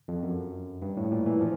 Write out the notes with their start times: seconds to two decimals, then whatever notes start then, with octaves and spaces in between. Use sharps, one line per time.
0.08 F2
0.23 F#2
0.82 G2
0.97 A2
1.12 A#2
1.26 E3
1.41 F3